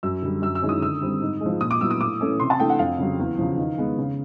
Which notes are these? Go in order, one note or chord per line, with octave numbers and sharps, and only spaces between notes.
F#2 E6
D3 G3
F#2 E6
E6
D#3 G#3 C#4 E4
D#6
D3 E6
G3 C4
G#2
G#3
F3
A#2 D#6
D6
F#3 B3 E4 E6
D#6
A2 D6
E3 A3 C#4
C3 C6
A5
E3 A3 D4 G5
F#5
F2 F5
C#3 F#3
E2
C#3 F3
D#3
G#3 B3
C#3